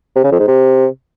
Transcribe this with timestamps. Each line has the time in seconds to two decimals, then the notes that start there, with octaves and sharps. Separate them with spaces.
0.16 C3
0.24 C#3
0.32 F2
0.39 G#2
0.47 C3